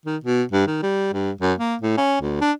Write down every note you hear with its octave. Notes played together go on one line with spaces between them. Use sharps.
D#3
B2
G2
D#3
G3
G2
F#2
A#3
A2
C#4
D2
D4